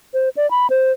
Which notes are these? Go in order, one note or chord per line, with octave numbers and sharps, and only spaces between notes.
C5
D5
B5
C5